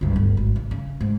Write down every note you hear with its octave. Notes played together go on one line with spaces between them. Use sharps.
C#2 G2
D1 G1
G#1
C#3
C#3
G#2